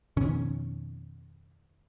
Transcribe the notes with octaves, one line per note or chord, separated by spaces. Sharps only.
F2 B2 D#3 C#4